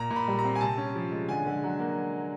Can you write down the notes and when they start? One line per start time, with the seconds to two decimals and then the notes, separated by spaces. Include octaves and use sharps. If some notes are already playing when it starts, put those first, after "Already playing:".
Already playing: A#2 A#5
0.10 A#2
0.16 B5
0.28 G3
0.39 A#5
0.44 C4
0.55 G#5
0.61 C3 A5
0.77 C#4
0.96 F3
1.11 G#3
1.29 D3 G#5
1.46 D3
1.63 F#3
1.79 A#3